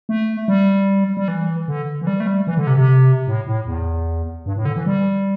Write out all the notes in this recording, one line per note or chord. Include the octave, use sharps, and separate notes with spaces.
A3
G3
G3
E3
D3
E3
G3
A3
G3
E3
D3
C3
C3
A2
A2
E2
G2
A2
D3
E3
G3